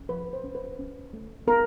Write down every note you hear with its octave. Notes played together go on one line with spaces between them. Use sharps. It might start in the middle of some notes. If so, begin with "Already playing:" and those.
Already playing: C#4
F3 B4
C5
C#4
B4
C#4
A3
B3 A#4